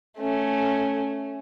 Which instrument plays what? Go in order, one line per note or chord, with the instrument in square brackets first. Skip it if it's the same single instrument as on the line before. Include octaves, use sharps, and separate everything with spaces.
[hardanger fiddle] A3 C#4